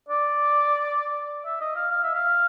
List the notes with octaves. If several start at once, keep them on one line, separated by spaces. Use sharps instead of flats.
D5
E5
D#5
F5
F5
E5
F5